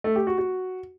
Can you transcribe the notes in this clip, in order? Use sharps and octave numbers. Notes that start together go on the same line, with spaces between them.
A3
G4
F#4
F#4